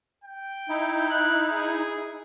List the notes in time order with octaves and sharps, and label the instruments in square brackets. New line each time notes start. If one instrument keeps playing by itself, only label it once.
[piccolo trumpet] G5
[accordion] D#4 E4
[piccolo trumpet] F#6
G#4